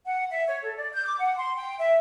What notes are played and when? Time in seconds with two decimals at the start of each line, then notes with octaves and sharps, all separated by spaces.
0.06 F#5
0.31 E5
0.47 C#5
0.63 A4
0.76 D5
0.93 G6
1.06 D6
1.19 F#5
1.38 C6
1.56 G5
1.79 E5